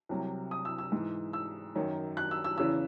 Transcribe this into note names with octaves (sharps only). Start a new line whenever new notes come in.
C2 C3 F#3
D#6
E6
E6
G#2 E3
E6
F#2 D#3 F#3
F#6
E6
E6
E2 C#3 E3 E6